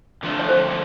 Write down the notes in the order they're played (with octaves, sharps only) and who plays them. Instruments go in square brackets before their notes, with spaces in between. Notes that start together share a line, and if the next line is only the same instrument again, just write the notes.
[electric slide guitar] D3 F3 A3 D4
[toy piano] C#5
C5